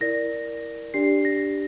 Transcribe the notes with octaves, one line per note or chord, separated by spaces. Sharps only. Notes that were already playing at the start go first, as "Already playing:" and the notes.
E4 A#4 D5 A#6
D4 G4 D5 C7
A#6